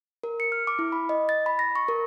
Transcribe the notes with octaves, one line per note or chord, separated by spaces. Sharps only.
A#4
C#7
F6
D6
E4
B5
D#5
A6
B5
A#6
C#6
A#4